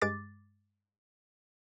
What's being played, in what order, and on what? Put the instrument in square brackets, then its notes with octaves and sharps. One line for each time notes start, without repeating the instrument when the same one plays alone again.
[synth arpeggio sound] G2 G#3 D6 A6